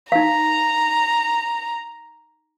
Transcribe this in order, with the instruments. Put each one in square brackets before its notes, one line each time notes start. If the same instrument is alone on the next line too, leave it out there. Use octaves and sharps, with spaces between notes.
[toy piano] D#4 F5 [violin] A#5